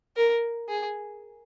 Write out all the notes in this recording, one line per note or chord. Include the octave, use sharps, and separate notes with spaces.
A#4
G#4